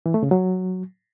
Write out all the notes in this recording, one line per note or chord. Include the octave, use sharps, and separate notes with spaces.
E3
A3
C#3
F#3